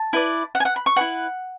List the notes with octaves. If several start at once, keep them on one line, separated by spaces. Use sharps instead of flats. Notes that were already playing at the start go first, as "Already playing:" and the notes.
Already playing: A5
E4 B4 D5
F#5
G#5
F#5
B5
C#6
E4 G#4 B4 F#5